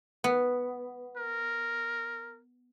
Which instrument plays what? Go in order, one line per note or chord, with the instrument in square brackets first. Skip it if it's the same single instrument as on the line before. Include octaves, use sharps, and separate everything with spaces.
[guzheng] B3
[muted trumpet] A#4